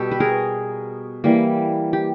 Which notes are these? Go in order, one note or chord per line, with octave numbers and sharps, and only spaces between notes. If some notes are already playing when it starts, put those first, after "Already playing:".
Already playing: B2 G3 B3 G4 A4
B4
G#4 A#4
E3 G3 A#3
G4